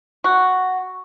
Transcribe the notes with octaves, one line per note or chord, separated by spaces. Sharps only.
F#4